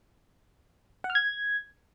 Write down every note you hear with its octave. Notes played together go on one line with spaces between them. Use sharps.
F#5
F6
G#6